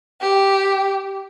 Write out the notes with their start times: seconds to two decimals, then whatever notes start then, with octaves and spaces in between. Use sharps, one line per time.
0.20 G4